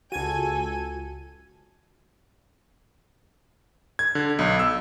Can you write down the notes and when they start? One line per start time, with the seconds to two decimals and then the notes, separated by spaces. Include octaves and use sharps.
0.12 C#2 F4 F#4 A4 G#5 G#6 D#7
3.99 G#6
4.15 D3
4.39 B1
4.59 E6